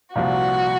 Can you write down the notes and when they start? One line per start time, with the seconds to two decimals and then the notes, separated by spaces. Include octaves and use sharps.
0.15 C2 A#2 F3 F#4